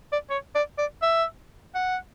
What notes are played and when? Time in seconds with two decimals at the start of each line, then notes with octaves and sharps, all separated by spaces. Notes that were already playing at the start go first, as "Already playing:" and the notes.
0.12 D5
0.30 C#5
0.55 D5
0.78 D5
1.02 E5
1.75 F#5